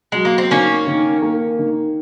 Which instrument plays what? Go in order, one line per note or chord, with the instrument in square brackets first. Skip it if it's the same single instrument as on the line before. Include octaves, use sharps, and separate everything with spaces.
[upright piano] F#3 [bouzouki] G#3
[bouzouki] A#3
C4
[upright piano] D#3 [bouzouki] A#3 C#4
[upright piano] D#3
A#3
D#3